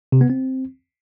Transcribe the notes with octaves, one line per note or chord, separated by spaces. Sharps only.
C3
B3
C4